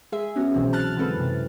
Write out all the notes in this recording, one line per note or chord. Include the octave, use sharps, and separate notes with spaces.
G#3 G#4 E5
B3 C#4 F#4
C2 B2 E3 F#3 C4
A5 F6 F#6 A6
D3 E3 G#3 C4 A4 B4
F#2 C3 E3